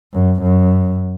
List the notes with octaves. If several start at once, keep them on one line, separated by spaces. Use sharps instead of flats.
F#2
F#2